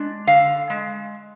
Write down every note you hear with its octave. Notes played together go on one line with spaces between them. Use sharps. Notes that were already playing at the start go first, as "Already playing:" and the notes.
Already playing: G#3 D4
D3 F5
G#3